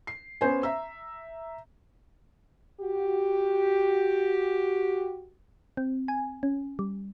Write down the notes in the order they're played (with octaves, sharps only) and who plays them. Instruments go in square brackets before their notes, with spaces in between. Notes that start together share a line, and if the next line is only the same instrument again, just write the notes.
[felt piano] C7
B3 C#4 C5 G#5
E5 A#5 E6
[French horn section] F#4 G4
[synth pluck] C4
G#5
C#4
G3